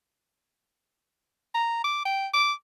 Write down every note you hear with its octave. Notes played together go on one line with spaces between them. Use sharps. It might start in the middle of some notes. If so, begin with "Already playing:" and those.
A#5
D6
G5
D6